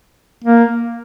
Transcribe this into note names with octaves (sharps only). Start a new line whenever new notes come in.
A#3